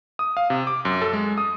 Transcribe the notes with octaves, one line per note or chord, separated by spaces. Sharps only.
D#6
F5
C3
D6
F#2
A4
G#3
D#6